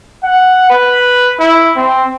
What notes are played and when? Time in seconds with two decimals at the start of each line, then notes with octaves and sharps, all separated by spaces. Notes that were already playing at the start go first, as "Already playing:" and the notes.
0.23 F#5
0.70 B4
1.40 E4
1.77 C4